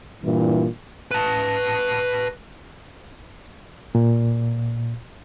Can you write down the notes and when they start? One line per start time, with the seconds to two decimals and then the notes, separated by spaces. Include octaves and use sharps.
0.24 G2 A#2 E3
1.11 B4 A5
3.95 A#2